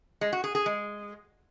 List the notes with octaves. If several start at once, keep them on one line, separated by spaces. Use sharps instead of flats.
G#3
F#4
G#4
G#4
G#3